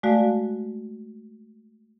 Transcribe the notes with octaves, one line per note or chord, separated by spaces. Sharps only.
G#3 A3 F#4 D5 F5